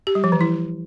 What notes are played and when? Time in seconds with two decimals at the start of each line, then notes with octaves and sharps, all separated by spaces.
0.07 G4
0.15 G3
0.24 F3
0.32 E3
0.41 E4